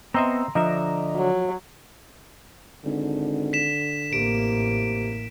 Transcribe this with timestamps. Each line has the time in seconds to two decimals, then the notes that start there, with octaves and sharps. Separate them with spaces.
0.14 B3 C4 D#5 E5 A#5 C6 E6
0.55 D3 F3 D4 D#5 E5 A#5
1.16 F#3
2.85 G#1 D3
3.53 B6 E7
4.13 A1 C3 A#3 D7